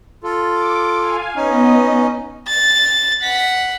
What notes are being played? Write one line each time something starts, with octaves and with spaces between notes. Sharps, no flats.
F4 A4
D6
F5 G#5
B3 C#4 D#4 D#5
A6
F#5 B6